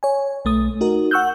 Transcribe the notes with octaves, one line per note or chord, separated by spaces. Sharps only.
C#5 G#5
B1 A3 D#6
D#4 F#4 A#4
F#5 C#6 E6 F#6 G6